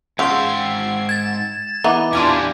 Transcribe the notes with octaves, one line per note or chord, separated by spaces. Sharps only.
G#2 C#3 F4 F#5 G5 E6 G#6 C7
G#6 A6 E7
E3 B3 D#4 A#5 D6
E2 G3 D4 F4 G#5